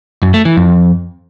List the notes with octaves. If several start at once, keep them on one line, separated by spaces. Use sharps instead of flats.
F#2
A3
E3
F2